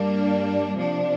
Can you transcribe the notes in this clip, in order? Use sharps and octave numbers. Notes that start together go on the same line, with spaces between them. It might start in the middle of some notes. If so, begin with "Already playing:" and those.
Already playing: G2 G3 A#3 D4
C3 F3 D4